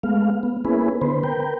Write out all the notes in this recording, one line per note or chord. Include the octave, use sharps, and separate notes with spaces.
G#3 A3 B3 F5
B3
A#3 B3 C#4 E4 G#4 B4
D3 B3 B4 C5
A#4 B4 G5